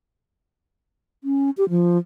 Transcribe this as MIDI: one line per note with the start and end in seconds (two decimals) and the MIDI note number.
1.24 1.50 61
1.57 1.68 67
1.70 1.98 53